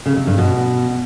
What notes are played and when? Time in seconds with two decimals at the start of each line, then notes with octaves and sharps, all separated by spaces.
0.06 C#3
0.16 C3
0.27 G2
0.38 B2